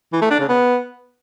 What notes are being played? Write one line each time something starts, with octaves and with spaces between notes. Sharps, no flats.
E3
A3
D4
C#3
B3